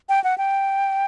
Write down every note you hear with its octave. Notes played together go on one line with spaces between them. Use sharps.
G5
F#5
G5